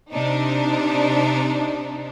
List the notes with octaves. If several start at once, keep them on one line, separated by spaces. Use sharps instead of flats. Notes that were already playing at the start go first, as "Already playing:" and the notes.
C3 D4 D#4